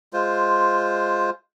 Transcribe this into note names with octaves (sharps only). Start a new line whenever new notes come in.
G#3 F4 C5